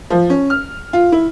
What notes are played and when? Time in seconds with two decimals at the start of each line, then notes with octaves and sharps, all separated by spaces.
0.10 F3
0.30 C#4
0.50 F6
0.93 F4
1.12 E4